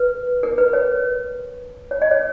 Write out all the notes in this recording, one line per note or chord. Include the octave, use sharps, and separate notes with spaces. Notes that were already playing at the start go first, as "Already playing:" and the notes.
Already playing: B4
A#4
B4
C#5
C#5
D#5
C#5